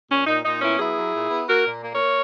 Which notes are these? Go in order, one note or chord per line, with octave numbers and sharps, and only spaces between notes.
A#2 C#4
A#2 D#4
A#2 D#4
B3 C#4 E4
F#3 E4 G#4
F#3
A#2
B3
A#3 F#4 A#4
A#2
A#3
A#4 C#5
A#3